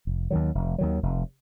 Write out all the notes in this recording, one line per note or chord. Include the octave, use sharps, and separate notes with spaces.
F1
D#2 D#3 F#3
F1
D#2 D#3 F#3
F1